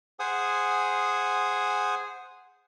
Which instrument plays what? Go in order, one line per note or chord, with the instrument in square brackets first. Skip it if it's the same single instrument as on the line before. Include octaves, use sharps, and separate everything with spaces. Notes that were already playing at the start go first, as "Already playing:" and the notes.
[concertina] G#4 C5 F#5 G#5 D#6